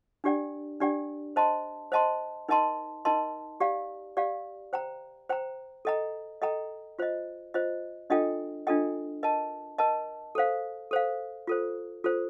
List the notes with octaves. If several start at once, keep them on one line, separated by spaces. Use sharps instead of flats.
D4 G4 D5 G5
D4 G4 D5 G5
C5 D#5 A5 C6
C5 D#5 A5 C6
D#4 A#4 D#5 A5 C6
D#4 A#4 D#5 A5 C6
G4 D5 F5
G4 D5 F5
C5 G5 A#5
C5 G5 A#5
A4 D#5 G5 A#5
A4 D#5 G5 A#5
F4 C5 D#5
F4 C5 D#5
D4 F4 A4 D#5 G5
D4 F4 A4 D#5 G5
A#4 D#5 A5
A#4 D#5 A5
A4 C5 F5
A4 C5 F5
F4 A4 C5
F4 A4 C5